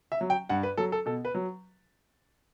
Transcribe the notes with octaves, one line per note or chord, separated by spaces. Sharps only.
E5
F#3
G5
G2 F#5
B4
F#3 A4
A4
B2 A4
B4
F#3